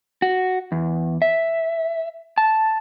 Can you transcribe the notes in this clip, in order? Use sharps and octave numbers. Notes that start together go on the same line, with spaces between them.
F#4
E2
E5
A5